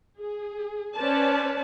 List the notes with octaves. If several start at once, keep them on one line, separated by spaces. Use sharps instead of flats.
G#4
C#4 B4 C5 D5 A5